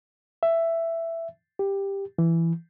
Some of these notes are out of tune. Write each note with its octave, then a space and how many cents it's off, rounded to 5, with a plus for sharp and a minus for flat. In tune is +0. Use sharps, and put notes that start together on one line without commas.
E5 +10
G4 +10
E3 +10